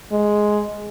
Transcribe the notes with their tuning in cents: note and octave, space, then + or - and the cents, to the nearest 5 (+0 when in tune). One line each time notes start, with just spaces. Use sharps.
G#3 +5